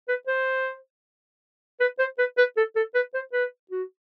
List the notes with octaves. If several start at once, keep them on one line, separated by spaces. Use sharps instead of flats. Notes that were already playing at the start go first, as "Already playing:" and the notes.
B4
C5
B4
C5
B4
B4
A4
A4
B4
C5
B4
F#4